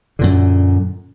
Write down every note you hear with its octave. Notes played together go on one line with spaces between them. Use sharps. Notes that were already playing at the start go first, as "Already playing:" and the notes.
F#2 A#2 D3